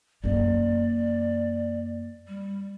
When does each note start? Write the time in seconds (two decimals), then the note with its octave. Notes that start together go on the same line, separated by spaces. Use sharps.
0.24 F#2 A#3 D5
2.28 G3